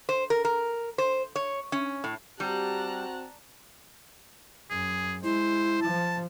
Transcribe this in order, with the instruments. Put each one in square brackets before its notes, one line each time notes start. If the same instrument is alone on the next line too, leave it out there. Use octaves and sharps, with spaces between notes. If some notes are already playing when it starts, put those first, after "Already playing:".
[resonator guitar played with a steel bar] C5
A#4
A#4
C5
C#5
C#4
A2
[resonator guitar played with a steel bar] G3 [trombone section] C4 F#4 [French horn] G4 [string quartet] A5 A#5 F#6
[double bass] F#2 [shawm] G#4
[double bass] G#3 [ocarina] E4 [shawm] C5
[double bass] F3 [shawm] A5